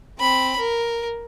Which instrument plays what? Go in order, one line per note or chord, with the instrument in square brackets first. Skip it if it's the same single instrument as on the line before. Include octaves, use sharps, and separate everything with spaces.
[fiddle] C4 B5
A#4